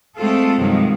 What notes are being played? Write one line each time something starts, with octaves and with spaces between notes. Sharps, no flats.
G#3 A3 C4 F4 A4
G2 C3 D#3 F3 F#3 G#3